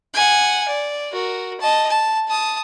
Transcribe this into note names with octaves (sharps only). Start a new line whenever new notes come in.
F#5 G#5
D5
F#4 A#4
D#5 A5
A5
A5 D#6